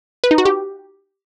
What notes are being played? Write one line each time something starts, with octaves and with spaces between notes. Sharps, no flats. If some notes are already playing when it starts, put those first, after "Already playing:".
B4
D#4
F#4
G4